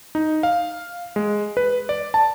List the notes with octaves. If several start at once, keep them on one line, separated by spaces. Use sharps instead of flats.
D#4
F5
G#3
B4
D5
A5